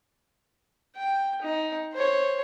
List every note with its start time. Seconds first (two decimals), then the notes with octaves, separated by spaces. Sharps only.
0.97 G5
1.42 D#4
1.94 C5 C#5